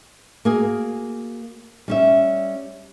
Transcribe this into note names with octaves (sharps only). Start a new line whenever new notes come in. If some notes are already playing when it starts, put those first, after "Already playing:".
A#3 F#4 G#4
G3 C#4 E5